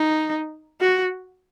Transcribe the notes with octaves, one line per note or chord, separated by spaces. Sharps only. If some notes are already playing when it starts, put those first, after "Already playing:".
Already playing: D#4
F#4